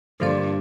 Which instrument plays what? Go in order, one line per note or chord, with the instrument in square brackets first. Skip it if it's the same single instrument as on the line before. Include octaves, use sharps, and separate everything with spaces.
[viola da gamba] G2 [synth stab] D3 F3 A#3 F4 D5